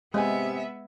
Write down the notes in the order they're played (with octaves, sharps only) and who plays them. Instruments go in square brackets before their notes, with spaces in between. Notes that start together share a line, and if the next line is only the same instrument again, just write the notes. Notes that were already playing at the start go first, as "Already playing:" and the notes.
[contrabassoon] C3 [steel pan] G#3 [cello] B3 E5 [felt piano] D#5 G#5